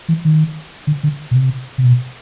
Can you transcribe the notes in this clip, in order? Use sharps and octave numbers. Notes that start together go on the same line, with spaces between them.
E3
D#3
D3
D3
B2
C3
C3
B2